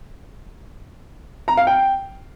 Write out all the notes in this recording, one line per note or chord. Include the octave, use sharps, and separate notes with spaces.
A#5
F5
G5